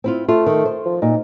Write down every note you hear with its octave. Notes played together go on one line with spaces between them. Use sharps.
C4 E4 F4
A3 F4
D#3
C5
F3
A#2 D#4